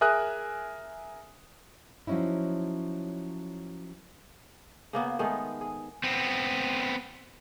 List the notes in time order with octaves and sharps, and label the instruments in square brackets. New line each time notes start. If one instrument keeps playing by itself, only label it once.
[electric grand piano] G#4 A#4 E5 G#5 D#6 F#6
[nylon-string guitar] F3 F#3 C#4 D#4 E4
[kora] C#3 A#3 B3
D#3 G#3 A3 B3
G#4
[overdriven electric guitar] B3 C4